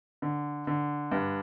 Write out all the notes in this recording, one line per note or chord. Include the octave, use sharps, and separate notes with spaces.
D3
D3
G2